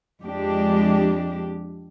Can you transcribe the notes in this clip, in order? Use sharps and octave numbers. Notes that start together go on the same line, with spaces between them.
F2 G#3 D4 G4